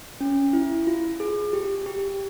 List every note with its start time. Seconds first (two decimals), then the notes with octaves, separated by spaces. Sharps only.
0.21 C#4
0.53 E4
0.87 F4
1.20 G#4
1.53 G4
1.86 G4